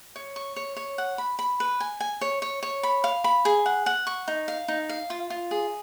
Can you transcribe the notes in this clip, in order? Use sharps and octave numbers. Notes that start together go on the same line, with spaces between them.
C#5
C#6
C#5
C#5
F#5
B5
B5
B4
G#5
G#5
C#5
C#5
C#5
B5
F5
B5
G#4
F#5
F#5
C#6
D#4
F5
D#4
F5
F4
F4
G#4